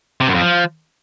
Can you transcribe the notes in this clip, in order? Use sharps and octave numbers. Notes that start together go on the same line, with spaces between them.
C3
F#2
F2
F3